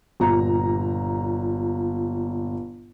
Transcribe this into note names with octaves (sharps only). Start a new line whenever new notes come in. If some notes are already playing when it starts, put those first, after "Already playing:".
G1 A#2 A#5